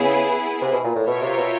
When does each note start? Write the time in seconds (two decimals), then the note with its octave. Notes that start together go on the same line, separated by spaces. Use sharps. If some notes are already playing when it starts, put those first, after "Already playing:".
Already playing: C#3 B3 E4 G#4
0.62 C3
0.73 B2
0.84 A#2
0.96 A2
1.07 B2 F4 A#4 C#5 E5 G5
1.22 C3
1.37 B2